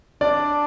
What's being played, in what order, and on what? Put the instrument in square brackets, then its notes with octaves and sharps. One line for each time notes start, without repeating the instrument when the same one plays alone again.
[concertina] D4 [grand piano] D5